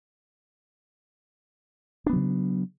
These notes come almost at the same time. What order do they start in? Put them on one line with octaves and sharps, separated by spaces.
D4 B3 F#3 C#3